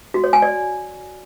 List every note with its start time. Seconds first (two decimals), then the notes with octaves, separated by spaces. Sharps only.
0.14 F#4
0.24 C#5
0.33 G#5
0.42 D5